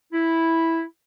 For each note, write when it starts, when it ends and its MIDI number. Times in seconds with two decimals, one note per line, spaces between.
0.13 0.82 64